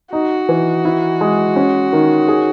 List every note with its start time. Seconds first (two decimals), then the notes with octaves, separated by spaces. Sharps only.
0.13 D#4 F#4
0.49 E3
0.85 E4
1.21 G#3
1.56 C#4
1.93 D#3
2.28 G#4